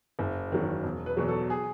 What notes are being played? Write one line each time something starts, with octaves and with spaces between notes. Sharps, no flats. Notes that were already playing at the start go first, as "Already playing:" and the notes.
F#1
E2 D#3 F#3
E1
B4
E2 B2 F#3
A4
G#4